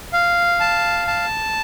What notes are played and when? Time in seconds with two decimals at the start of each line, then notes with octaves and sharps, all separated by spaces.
0.13 F5
0.60 A5
1.07 A5